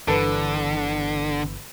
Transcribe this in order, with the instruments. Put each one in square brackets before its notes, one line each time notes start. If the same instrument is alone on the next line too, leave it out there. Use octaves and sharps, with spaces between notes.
[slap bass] G1 G2 E3 [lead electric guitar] D3 [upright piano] A4 B4 A5